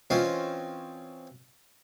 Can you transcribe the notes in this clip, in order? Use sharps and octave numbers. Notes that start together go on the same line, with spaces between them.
E3 C4 C#4 F4 D#5